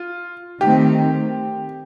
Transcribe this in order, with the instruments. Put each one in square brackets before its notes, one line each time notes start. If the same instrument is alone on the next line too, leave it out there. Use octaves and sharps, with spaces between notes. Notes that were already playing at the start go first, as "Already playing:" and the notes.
Already playing: [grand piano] F4
[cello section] D#3 A3 C4 [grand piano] G4